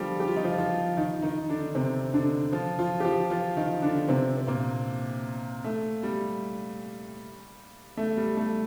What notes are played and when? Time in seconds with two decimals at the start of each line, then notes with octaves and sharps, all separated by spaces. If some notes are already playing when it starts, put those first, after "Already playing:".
Already playing: D3 F3 G3 F4 G4
0.20 G4
0.28 F4
0.36 D#4
0.45 F3 F4
0.58 F3 F4
0.97 D#3 D#4
1.22 D#3 D#4
1.49 D3 D4
1.75 C3 C4
2.13 D3 D4
2.52 F3 F4
2.79 F3 F4
3.00 G4
3.05 F3 F4
3.30 F3 F4
3.57 D#3 D#4
3.82 D3 D4
4.08 C3 C4
4.37 C4
4.47 A#2 A#3
5.64 A3
6.03 G3
7.97 A3
8.17 G3
8.37 A3